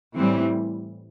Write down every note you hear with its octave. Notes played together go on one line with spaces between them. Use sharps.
A2 E3 G3 C4